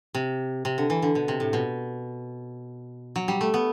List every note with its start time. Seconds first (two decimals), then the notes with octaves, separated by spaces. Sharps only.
0.14 C3
0.65 C3
0.78 D3
0.90 E3
1.02 D3
1.15 B2
1.28 C3
1.40 A2
1.53 B2
3.16 F#3
3.28 G3
3.41 A3
3.54 B3